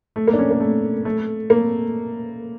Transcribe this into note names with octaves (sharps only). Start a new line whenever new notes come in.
A3
A#3
D4
C#4
A#3
A3
A3
A#3